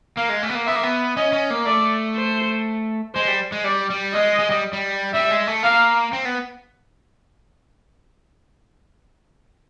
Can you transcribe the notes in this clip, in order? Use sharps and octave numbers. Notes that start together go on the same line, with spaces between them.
A#3 F5
G#3
A3
B3
A#3
B3 E5
A#3
B3
C#4 D#5
C#4
A#3
A3 D5
C5
G#3 C5
G3
G#3
G3 D5
G3
G#3 D#5
G#3
G3
G3
G3 E5
G#3
A3
A#3 F5
C4
B3